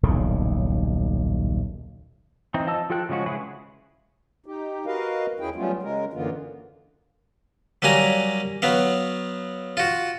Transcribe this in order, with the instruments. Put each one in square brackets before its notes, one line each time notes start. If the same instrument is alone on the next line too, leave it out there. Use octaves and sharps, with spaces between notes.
[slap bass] D#1 B1 A2 C#3
[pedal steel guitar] E3 C4 D#4
F3 D#5 A5 E6
F3 F4 A4 G5 F#6
C#3 F3 G#3 C#4 F#4
C#3 G#3 E4 G#4 B4
[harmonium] D#4 G4
F#4 A#4 B4 D#5 F5
E2 C#4 E4 G#4 G5
F#3 G3 A3 B3 C#4 F4
C#3 G#3 A#4
F#2 D3 E3 A#3 B3 F4
[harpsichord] F#3 G3 A#3 G#5 A#5
F#3 B3 F5
F4 F#4